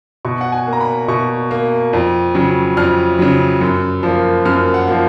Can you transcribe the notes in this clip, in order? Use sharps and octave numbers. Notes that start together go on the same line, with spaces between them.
B2 C#6
F#5
G#5
A#3
A#5
B5
B2 C#6
A#3
F2
C#3 F#3
F2 F6
C#3 F#3
F#2
F3 A#3
F#2 F6
F#5
F3 A#3